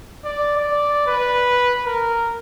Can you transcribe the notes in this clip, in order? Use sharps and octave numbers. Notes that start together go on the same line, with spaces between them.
D5
D5
B4
A#4